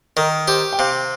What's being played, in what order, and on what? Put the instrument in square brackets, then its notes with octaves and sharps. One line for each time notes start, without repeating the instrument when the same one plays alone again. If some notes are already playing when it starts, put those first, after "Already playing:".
[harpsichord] D#3 [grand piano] A#4
[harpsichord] G4 [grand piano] C5
[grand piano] G5
[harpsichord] C3 [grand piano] F5